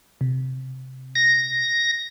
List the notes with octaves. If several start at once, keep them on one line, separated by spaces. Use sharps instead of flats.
C3
A#6